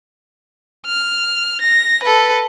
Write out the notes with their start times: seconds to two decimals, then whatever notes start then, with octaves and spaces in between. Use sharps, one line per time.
0.86 F6
1.61 A#6
2.03 A4 B4